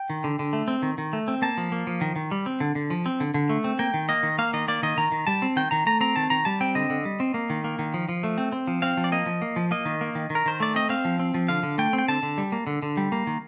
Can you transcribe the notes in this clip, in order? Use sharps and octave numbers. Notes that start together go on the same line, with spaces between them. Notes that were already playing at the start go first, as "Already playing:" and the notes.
Already playing: G5
D#3
D3
D3
A3
C4
D#3
D#3
A3
C4
A#3 A5
F3
A#3
F3
D#3
D#3
G3
C4
D3
D3
F3
C4
D3
D3
A3
C4
A#3 G5
D#3
A#3 D#5
D#3
A#3 F5
D#3 D#5
A#3 D5
D#3 D#5
D#3 A#5
D#3
G3 A5
C4
D#3 G5
D#3 A#5
A3 A#5
C4 A#5
D#3 A5
D#3 A#5
G3 A5
C4 G5
D3 D#5
D3
G3
C4
A#3
D#3
A#3
D#3
F3
F3
A3
C4
C4
F3
C4 F5
F3
D5
A#3 D#5
F3
A#3
F3
A#3 D#5
D#3
A#3
D#3
D#3
A#4
D#3 C5
A3 D5
C4 D#5
C4 F5
F3
C4
F3
D3 F5
D3
A3 G5
C4
G5
D3 A5
D3
G3
A#3
D3
D3
G3
A#3
D#3